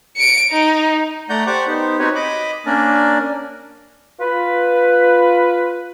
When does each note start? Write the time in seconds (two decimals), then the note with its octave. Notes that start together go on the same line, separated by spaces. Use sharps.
0.17 C#7 D7
0.51 D#4
1.29 A3 D5 F#5 A#5 G6
1.47 G4 C5 D5 F#5 C#6 D6
1.67 B3 D#4 G4 C5
1.99 C4 D#4 F#4 G4 B4 C#5
2.15 D#5 B5 D6
2.66 A#3 C#4 D4 A#4 D5
4.20 F4 B4